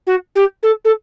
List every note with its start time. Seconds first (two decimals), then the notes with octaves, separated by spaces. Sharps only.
0.06 F#4
0.35 G4
0.62 A4
0.84 A4